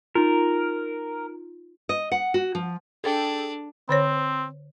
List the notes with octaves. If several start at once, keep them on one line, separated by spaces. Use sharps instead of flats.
D#4 F4 A#4
D#5
F#5
F#4
F3
D4 G#4 A4 G5
D3 C4 C5 C#5